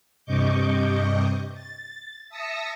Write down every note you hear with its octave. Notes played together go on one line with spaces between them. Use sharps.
G2 C3 D#5 C#6 D6 G6
A6
E5 A5 D#6 E6 A#6 C#7